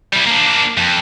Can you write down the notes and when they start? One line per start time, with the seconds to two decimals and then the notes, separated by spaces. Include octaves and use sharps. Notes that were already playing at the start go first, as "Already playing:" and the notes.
0.13 G3 E4
0.27 A#3 D4
0.77 F2